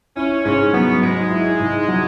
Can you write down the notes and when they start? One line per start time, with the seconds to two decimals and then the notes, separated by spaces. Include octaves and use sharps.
0.16 C#4 E4
0.45 G#2 C#4
0.73 F#3 B3
1.02 G#2 G#3
1.31 E4
1.60 G#2
1.88 F#3